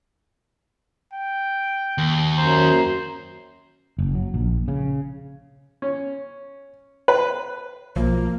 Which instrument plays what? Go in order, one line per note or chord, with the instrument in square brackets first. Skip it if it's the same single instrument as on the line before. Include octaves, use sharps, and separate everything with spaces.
[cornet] G5
[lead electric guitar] D#2
[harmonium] F#2 A#5 [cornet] C5
[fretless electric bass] F#1
F#3
A#1
C#3
[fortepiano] C#4
B4
[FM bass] B1 [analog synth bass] F3 [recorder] A#3